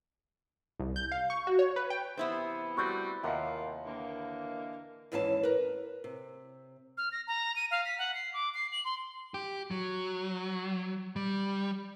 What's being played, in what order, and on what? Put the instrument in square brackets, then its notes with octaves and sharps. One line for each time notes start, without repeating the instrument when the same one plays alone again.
[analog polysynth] C2
G6
F5
C#6
F#4
C#5
B4
G5
[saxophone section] C3 E3 [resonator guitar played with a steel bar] B3 E4 C5
[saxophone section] G3 F#4 [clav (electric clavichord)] A3 C4 [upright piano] C#6 F#6 G6
[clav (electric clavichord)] D#2 C3 [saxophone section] A#3 F4 A#4 [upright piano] D#5 E5 F#5
[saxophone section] D3 E3 A#3
[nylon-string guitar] D#2 G#2 E3 C#4 G#5 A5
A#4 B4
C3
[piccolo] F6
A#6
A#5
D#7
F5
B6
F#5
C7
D6
C7
F#7
C6
[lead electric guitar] G4
F#3
G3